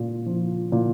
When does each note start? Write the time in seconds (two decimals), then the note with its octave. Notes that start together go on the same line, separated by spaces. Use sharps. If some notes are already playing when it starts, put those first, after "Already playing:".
Already playing: A#2
0.26 F3
0.72 A#2